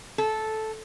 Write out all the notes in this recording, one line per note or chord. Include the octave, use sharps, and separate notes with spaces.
A4